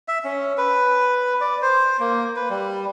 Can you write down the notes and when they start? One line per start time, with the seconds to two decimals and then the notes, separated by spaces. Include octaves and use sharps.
0.08 E5
0.24 C#4
0.58 B4
1.41 D5
1.62 C5
2.00 A#3
2.36 B4
2.50 G3